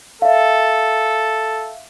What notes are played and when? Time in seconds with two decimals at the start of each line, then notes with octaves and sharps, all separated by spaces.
0.22 A4 E5 F5